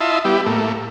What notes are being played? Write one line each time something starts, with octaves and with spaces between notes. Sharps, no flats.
E4 F4 D#5 E5 A5 C6
G3 B3 E4 G4
A2 A3 A#3